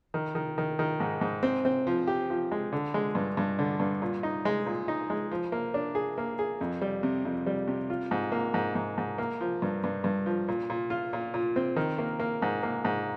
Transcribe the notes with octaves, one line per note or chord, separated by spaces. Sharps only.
D#3
D#3
D#3
D#3
G#2
G#2
C4
C4
F3
G4
F3
G#3
D3
G#3
G2
G2
D3
G2
A#2
D#4
G#3
A#2
D#4
G#3
F3
A#3
D4
G#4
A#3
G#4
F2
G3
C3
F2
G3
C3
F4
G#2
A#3
G#2
G#2
G#2
A#3
F3
G2
G2
G2
F3
A#2
A#2
F4
A#2
A#2
C4
D#3
A#3
A#3
G#2
A#3
G#2